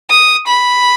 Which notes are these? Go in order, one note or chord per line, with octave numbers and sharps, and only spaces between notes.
D#6
B5